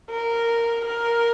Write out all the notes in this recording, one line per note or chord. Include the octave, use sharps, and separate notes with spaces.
A#4
A#4